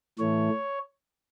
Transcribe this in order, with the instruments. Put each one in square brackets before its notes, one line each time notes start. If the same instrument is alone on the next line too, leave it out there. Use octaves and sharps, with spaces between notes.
[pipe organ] A2 E3 A3 C#5